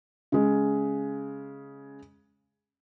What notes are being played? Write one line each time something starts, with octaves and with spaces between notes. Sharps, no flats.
C#3 G#3